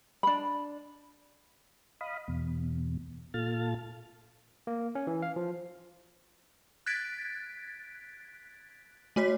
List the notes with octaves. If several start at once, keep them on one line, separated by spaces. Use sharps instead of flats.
D4 B5
D#5 F5 B5 D#6
E2 B2
A#2 F4 A4 F6 A6
A#3
C#4
E3
F5
F3
F#6 G#6 A6 B6 D7
A3 F#4 C#5 B6